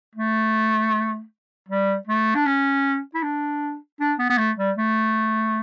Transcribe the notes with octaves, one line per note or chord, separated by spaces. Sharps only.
A3
G3
A3
D4
C#4
E4
D4
D4
B3
B3
A3
G3
A3